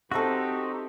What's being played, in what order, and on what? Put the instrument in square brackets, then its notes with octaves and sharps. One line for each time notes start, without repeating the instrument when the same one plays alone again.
[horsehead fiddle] C4 G4 [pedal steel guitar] D#4 F#4 [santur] A4 C5 E5